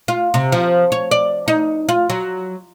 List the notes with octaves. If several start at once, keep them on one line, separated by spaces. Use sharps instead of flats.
F4
C3
F3
C#5
D5
D#4
F4
F#3